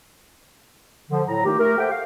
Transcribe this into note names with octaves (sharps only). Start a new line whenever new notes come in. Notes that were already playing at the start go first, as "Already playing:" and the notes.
D3 F3
A2 F#3 A#5
D#3 A3 D#4 F4 G4
A3 G4 A#4
G4 A4 C5 E5 F#5 G5
F5